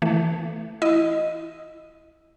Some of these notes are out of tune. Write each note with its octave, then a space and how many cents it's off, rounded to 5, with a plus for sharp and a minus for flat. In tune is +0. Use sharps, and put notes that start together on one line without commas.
E3 +0 A3 +0
E4 +0 D#5 +0